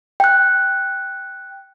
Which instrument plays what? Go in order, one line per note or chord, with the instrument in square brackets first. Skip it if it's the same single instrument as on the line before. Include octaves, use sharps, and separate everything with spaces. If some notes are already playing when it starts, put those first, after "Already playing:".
[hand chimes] G5 F#6